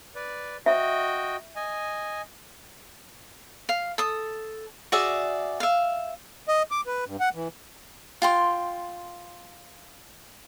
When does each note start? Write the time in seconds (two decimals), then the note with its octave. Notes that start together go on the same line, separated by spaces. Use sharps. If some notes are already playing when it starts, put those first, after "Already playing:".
0.15 B4 D5
0.66 F#4 D#5 E5 G5
1.56 D#5 G#5
3.69 F5
3.98 A4 D#6
4.92 F#4 G#4 D5 E5
5.60 E5 F5
6.48 D#5
6.71 D6
6.87 B4
7.07 G2
7.20 F#5
7.34 E3
8.22 F4 G5 C6